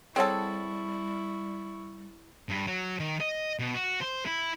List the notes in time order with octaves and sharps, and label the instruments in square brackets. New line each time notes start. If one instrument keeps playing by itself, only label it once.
[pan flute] G3 [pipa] C4 A4 [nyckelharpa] E4 C#6 [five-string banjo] G#4 C#5 F#5
[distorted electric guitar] G2
F#3
D#3
D#5
B2
F#4
C5
E4